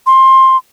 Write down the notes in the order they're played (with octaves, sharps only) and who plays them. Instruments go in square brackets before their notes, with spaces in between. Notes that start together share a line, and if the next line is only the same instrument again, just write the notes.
[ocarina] C6